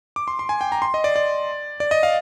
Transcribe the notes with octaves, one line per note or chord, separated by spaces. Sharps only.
D6
C6
C6
G#5
G5
A#5
C6
D#5
D5
D5
D5
D#5
F5